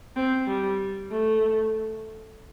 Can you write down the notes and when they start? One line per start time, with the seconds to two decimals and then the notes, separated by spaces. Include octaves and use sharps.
0.16 C4
0.48 G3
1.11 A3